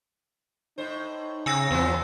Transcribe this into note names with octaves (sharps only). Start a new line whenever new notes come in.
A2 D#4 C5
C#3 G#5 E6 A#6
E2 E3 F3 B3 C4